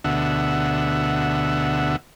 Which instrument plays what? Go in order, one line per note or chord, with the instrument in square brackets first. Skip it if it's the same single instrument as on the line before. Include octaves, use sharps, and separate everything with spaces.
[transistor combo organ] D2 B2 D3 E5 F#5